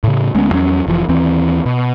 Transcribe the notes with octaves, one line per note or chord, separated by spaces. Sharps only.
A2 C#3
D2 G#3 B3 C#4
E2 F#3 C#4
F1 E3 F3
D#2 E3 C4
B2